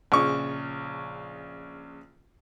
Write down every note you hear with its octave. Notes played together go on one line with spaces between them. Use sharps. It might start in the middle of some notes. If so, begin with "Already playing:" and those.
A#1 C#3 C#6